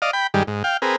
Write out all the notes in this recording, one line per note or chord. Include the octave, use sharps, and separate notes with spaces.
D5 D#5 F5
G5 B5
G2 D#3 G3 G#3
G#2
F5 G5
C4 G#4 A#4 B4